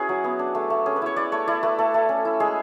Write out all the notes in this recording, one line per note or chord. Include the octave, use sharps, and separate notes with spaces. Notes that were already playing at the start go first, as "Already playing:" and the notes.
Already playing: C#4 E4 F#4 G#4 B4
F#3
B3
D4
A3
A3
C#4 G#4
B4
E4 C#5
E4 D5
A3 C#5
E4 D5
A3 B4
A3 A4
A3
C#4
E4
G#3 G#4